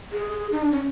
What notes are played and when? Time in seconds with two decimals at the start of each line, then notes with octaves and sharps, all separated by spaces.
0.12 G#4
0.52 D#4
0.62 D4
0.72 C#4